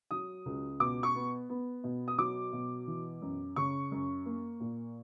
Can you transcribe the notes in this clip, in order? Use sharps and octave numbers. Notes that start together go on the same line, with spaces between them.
F#3 D#6
C#2
B2 D6
C#6
B3
B3
B2
D#6
F#3 D6
B2
E3
F#2
C#3 C#6
F#2
A#3
A#2